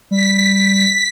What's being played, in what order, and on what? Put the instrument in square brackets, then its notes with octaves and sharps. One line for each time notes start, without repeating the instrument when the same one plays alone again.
[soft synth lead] G3 [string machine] B6